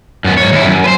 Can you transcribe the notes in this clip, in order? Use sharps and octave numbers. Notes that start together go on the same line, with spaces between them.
F#2 B3
G#2 C#5
D#2 E4
F#2
B4 C5